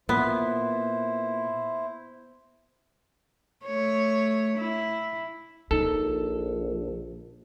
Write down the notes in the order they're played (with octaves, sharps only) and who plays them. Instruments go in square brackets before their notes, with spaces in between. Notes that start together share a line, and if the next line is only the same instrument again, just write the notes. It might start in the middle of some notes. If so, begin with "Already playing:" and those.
[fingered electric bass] A#2 [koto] B3 [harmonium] E4 C5
[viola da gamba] A3 C#5
E4
[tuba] A#1 [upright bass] D#4 [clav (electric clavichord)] A4